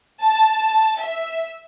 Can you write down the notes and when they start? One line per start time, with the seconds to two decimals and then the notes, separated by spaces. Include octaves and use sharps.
0.20 A5
0.99 E5